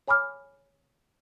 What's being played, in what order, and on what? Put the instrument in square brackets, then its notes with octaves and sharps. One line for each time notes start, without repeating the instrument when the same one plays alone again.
[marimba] C#5 G#5 B5 D6 F6